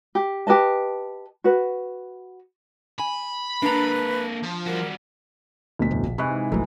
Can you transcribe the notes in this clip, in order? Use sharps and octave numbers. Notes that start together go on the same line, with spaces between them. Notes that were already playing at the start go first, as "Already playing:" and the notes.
G4
G4 B4 D#5 A5
F#4 B4
G#5 B5
A#3 D4 A4 B4 A#5
F3
G3 F#4 A#4
D2 B2 B6
F2 A2
A#1
G#2 C3 E3 B5 C#6 F#6
G1 C2 E3 F#3 A3 D#4